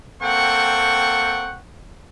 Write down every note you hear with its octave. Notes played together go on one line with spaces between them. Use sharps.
A#3 C4 A4 F#5 G5 C#6